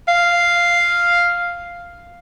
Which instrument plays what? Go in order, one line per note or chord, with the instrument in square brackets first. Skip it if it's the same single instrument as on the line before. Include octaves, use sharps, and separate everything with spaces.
[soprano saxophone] F5